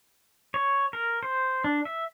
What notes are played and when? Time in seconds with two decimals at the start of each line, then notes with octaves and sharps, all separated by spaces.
0.54 C#5
0.93 A#4
1.23 C5
1.64 D4
1.85 E5